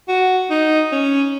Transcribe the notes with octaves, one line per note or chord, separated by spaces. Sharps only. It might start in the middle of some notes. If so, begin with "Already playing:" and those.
F#4
D#4
C#4